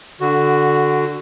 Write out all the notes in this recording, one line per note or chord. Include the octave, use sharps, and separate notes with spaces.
D3 F#4